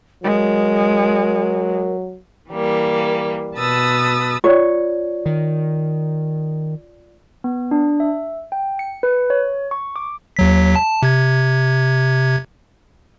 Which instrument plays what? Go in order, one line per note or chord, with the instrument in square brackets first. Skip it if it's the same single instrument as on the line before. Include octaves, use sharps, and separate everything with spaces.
[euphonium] F#3 [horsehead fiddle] G#3 [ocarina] A#4
[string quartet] E3 G3 A#3
B2 B4 A5 D#6 E6 A6
[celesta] F4 D5 [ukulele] C#5
[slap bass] D#3
[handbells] B3
D4
E5
G5
C#7
B4
C#5
C#6
D6
[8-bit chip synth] D#2 F#3 B6
A5
C3 G#6